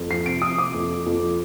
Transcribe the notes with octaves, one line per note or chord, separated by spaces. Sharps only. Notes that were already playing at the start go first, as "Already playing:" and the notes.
Already playing: F2
F3 C7
C3 D7
F3 D#6
C3 D6
F2
F3
F2
F3